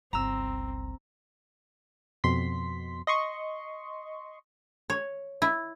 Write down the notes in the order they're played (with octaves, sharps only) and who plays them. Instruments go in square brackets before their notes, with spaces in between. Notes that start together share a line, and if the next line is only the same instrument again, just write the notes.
[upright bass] G1 C#2 [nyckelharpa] C4 [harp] A#5 E6
[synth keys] F2 B2 C6 B6
D#5 C6 C#6
[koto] C#5
E4